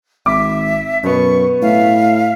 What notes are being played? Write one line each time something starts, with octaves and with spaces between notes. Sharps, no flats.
G#1 E5 D6
F#2 B2 B3 C#6
A2 E5 F5